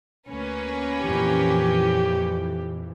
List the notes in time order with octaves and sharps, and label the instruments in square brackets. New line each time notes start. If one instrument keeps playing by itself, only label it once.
[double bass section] D2 [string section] A#3 C#4 B4
[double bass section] F2 A#2 E3 [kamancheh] G4